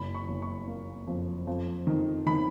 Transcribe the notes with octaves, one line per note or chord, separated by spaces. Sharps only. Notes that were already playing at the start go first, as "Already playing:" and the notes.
Already playing: F#1 B5
C#6
F#1
C#6
A#3
F2
F2
D#3
D#3 B5